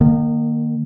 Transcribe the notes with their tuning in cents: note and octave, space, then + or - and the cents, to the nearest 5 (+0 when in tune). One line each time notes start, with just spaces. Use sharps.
D#3 -30 A#3 +0